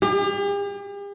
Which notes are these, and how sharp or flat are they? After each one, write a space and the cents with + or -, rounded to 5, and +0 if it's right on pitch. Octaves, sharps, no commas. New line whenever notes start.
G4 +45